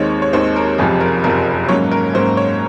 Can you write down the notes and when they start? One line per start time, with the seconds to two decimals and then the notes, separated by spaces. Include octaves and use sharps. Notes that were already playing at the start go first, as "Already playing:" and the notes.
Already playing: D#2 D#3 G#3 C4 C#5
0.22 C#5
0.33 D#2 D#3 G#3 C4 C5
0.56 A#4
0.78 F#1 F2 C3 F3 G#4
1.00 A#4
1.24 F#1 F2 C3 F3 A#4
1.69 G#2 F#3 A#3 C#4 C#5
1.91 A#4
2.14 G#2 F#3 A#3 C#4 C5
2.37 C#5